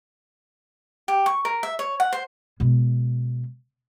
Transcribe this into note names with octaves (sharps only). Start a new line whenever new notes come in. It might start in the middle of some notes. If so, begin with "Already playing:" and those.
G4
C#6
A#4
E5
C#5
F#5
C5
B2 G#3